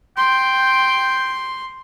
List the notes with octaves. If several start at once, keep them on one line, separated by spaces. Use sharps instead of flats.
G5 C6